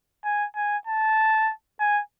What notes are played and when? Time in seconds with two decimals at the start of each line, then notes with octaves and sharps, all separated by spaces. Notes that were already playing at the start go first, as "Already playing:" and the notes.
0.25 G#5
0.56 G#5
0.87 A5
1.80 G#5